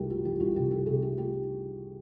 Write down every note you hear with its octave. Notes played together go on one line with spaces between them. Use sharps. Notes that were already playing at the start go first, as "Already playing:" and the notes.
Already playing: C2 C3 A3 F#4 G4 A#4
A3 F#4
E3 G4
C2 F#4
C3 G4
A3 G4
C3 G#4
A3 G4
A3 G4